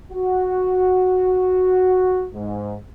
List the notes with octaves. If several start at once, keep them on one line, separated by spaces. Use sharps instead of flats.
F#4
G#2